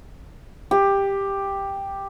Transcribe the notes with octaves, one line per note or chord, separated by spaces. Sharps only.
G4